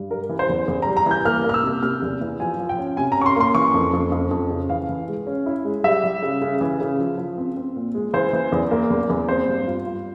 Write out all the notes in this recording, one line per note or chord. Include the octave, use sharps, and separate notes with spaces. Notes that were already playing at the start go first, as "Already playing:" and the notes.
Already playing: G2
G3 A#4
E3
C5
E2
E2
A#5
G3
A#5
E3 G6
A#3 F6
A#3 F6
E6
C3
C3 F6
E2
E3
F3 G#5
F3
G5
C#4
C3 G#5
A#5
C#4 C#6
C6
A#3 C6
E3 C#6
F2
F2
F2
F2
C#3
E3 F5
E3
G#3
C#4
E4
G#3
G3 E5
G3
C#3
C#3
E3
C#3
F3
F3
C4
C4
A#2
G#3
E3 C5
E3
E2
A#3
E2
E2
C4 C5
G2
F4
F4